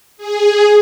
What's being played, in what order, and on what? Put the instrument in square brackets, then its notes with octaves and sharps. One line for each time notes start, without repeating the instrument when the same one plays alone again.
[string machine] G#4